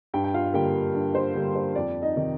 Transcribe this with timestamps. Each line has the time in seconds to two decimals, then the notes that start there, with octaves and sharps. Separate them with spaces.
0.14 G2 G4 G5
0.24 G5
0.34 F4 F5
0.54 D3 G3 A#3 G4 G5
0.94 G2
1.15 C5
1.35 D3 G3 A#3
1.55 C5
1.75 F2 D5
2.02 D#4 D#5
2.16 C3 D#3